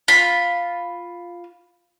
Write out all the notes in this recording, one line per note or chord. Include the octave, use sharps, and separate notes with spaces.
F4 B5